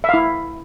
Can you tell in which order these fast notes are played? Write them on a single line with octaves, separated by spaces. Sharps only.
E5 F5 E4